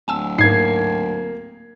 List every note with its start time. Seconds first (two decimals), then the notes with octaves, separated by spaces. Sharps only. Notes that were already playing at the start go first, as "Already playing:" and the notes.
0.08 D1 G#5 A5 E6
0.39 G#2 A#3 D#4 G#6 C7